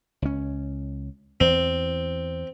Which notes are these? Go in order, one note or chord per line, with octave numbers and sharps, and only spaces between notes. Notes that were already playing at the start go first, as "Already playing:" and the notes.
C#2 C#4
E2 C4